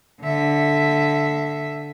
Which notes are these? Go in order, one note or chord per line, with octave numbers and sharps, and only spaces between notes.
D3 E5